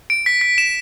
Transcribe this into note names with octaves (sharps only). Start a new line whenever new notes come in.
D7
B6
B6
E7